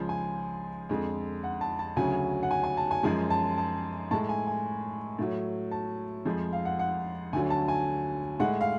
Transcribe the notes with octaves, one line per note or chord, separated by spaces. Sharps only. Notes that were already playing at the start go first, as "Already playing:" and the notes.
Already playing: C#2 C#3 F3 G#3
G#5
F2 D3 G#3
F#5
A5
A5
D2 C#3 F#3 G#5
F#5
G#5
G#5
A5
G#5
F#2 F3 G#3 G#5
A5
A5
A2 G#3 A5
G#5
G#5
A2 F#3
A5
F2 F3 G#3
F5
F#5
F#5
D2 D3 F#3 G#5
A5
G#5
A2 G#3 F#5
F5